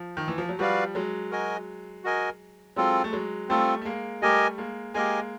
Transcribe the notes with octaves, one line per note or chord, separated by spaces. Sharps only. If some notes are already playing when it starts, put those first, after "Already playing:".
Already playing: F3
D#3
E3
F3
F#3
F3 G3 F#4 B4 D5 F5
F#3 G#3
F#4 A#4 D#5 G#5
F#4 A#4 D#5 G#5
F#3 G#3 C4 F4 A4
A3
F#3 G#3
G3 A3 C4 F4 A4
A3
G#3 A#3
G3 A3 G4 A#4 D#5 G#5
G#3 A#3
G#3 A#3 G4 A#4 D#5 G#5